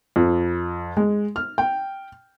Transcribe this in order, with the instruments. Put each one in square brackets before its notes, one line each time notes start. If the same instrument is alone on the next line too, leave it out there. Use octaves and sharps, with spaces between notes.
[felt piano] F2
G#3
F6
G5